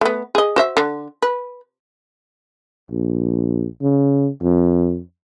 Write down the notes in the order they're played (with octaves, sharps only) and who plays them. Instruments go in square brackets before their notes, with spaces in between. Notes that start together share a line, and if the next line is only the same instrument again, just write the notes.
[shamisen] A3 B3
G#4 D#5
F#4 C5 E5
D3
B4
[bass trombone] A#1
C#3
F2